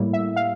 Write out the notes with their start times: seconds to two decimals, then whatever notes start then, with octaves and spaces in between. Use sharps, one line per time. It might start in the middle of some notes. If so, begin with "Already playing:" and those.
Already playing: A2 G3 A#3 E4
0.13 E5
0.36 F5